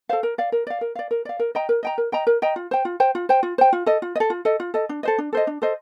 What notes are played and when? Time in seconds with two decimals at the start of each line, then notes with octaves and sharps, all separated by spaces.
0.09 A4 C5 F5
0.23 A#4
0.38 D5 F5
0.52 A#4
0.67 D5 F5
0.81 A#4
0.95 D5 F5
1.11 A#4
1.25 D5 F5
1.39 A#4
1.55 D#5 G5 A#5
1.69 A#4
1.83 D#5 G5 A#5
1.98 A#4
2.12 D#5 G5 A#5
2.27 A#4
2.42 D#5 G5 A#5
2.56 F4
2.71 C5 G5
2.85 F4
3.00 C5 G5
3.15 F4
3.29 C5 G5
3.43 F4
3.58 C5 G5
3.73 F4
3.86 A4 D#5
4.02 F4
4.15 D#5
4.20 A4
4.30 F4
4.45 A4 D#5
4.60 F4
4.74 A4 D#5
4.89 D4
5.03 A4 C5 D#5
5.18 D4
5.33 A4 C5 D#5
5.47 D4
5.62 A4 C5 D#5